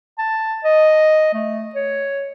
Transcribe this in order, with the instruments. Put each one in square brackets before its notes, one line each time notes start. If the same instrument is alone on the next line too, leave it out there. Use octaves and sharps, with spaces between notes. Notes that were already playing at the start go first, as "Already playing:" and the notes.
[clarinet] A5
D#5
A3
C#5